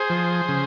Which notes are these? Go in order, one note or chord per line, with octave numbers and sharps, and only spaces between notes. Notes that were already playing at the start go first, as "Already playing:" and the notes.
Already playing: G#4 C5
F3
C#3